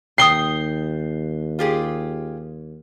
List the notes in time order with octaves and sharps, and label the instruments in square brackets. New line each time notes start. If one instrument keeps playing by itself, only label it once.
[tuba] D#2 [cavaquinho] G5 D#6 [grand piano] C7 G7
[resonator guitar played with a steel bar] F4 G4 G#4